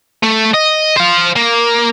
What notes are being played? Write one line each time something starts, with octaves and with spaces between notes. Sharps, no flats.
A3
D#5
C5 F5
A#3